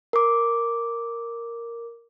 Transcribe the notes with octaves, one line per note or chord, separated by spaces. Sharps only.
A#4 D6